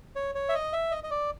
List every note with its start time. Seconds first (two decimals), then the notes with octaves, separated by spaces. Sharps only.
0.16 C#5
0.35 C#5
0.49 E5
0.55 D#5
0.73 E5
0.92 D#5
1.04 D#5
1.11 D5